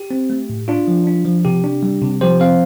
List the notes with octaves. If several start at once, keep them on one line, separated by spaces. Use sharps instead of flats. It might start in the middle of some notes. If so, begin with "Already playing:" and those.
Already playing: G4
C4
A3
A2
D4 F4
F3
D4
F3
C3 G4
D4
G3
C3
F3 G4 C5
C4 C5 F5